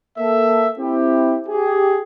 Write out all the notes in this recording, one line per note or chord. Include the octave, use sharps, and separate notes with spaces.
A#3 A4 E5
C4 E4 G4
G4 G#4